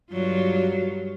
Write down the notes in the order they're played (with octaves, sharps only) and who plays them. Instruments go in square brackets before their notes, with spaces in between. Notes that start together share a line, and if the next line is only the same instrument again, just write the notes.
[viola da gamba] G2 F#3 F4